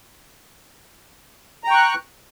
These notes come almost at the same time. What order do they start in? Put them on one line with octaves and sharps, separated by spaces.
A#5 G5 C#6 F#6